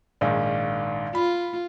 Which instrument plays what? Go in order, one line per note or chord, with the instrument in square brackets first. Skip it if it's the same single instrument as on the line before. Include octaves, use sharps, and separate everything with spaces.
[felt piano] A#1 G#2 D#3 [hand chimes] D5 F5
[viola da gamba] F4 [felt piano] B5